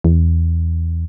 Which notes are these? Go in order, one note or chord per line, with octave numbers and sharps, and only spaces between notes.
E2